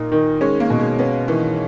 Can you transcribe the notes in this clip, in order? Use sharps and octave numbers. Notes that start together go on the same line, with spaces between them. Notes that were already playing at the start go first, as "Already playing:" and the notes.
Already playing: A#2 D#4
D#3
G#3 C#4
A#3
B2
G#3
B3 C#4
D#3 E3